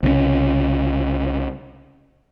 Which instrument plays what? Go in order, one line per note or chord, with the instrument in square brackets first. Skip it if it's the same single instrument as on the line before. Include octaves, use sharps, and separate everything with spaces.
[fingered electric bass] C2 C#3 G#3 C#4